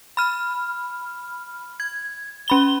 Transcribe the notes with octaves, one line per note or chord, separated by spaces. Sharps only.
B5 F6
G#6
C#4 B5 G7